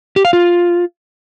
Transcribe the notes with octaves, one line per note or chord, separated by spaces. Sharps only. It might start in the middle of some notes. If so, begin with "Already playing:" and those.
G4
F5
F4